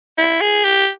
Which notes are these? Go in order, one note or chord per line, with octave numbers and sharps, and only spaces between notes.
E4
G#4
G4